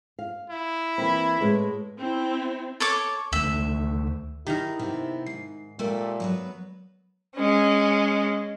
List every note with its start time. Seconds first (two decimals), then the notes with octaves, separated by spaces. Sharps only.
0.19 F5
0.50 E4
0.98 E3 A#3 C4 B5
1.41 A2 G#3 B4
1.98 C4 E4
2.80 A4 C#5 D6
3.33 D2 D#3 A3 E5
4.47 D#3 E4 G4 G#4 A#4 A#5 F6
4.79 C3 B3 C4
5.26 G#2 C7
5.79 A#2 G#3 A3 G4 A4 A#4
6.20 F#3 B3 B4
7.36 G#3 C#4